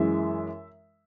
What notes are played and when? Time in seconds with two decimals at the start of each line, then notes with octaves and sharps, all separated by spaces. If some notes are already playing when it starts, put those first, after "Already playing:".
Already playing: F#2 E3 G#3 E5